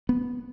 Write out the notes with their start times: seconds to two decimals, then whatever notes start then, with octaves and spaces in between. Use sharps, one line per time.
0.09 B3